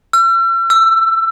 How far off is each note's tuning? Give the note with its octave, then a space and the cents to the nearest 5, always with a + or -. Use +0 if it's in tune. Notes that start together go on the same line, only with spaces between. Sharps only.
E6 +45
E6 +20